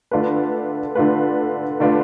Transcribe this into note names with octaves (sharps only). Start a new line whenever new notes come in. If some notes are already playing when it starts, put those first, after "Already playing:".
D3 A3 D4 F4 B4
D3 A3 D4 F4 B4
D3 A3 D4 F4 B4